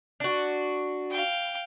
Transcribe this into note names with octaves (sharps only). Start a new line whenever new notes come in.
D4 F#4
F5 G5